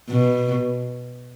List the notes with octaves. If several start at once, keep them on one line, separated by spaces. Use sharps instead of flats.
B2